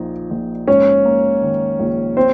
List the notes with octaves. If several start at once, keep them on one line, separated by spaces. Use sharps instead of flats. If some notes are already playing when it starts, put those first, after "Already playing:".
Already playing: A#1 A#2 F3 D#4
A#1
G#2 C#4 C#5
A#3
D#3
A#1
C4 C5